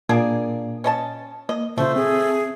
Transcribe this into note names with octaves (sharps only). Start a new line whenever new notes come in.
A#2 A#3 D4 G#4
C#4 D#5 A5
A#3 D#5
A#2 C#3 A3 F4 C5
C4 G#4